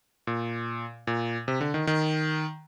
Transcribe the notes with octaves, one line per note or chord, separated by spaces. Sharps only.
A#2
A#2
C3
D3
D#3
D#3